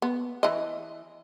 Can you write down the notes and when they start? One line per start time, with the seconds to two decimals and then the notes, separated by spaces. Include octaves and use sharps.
0.02 B3
0.43 E3 D#5